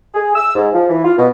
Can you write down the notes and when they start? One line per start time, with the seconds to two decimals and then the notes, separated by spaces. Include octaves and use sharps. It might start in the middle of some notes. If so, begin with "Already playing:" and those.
0.14 G#4
0.35 E6
0.55 G#2
0.73 F3
0.89 E3
1.04 F4
1.18 B2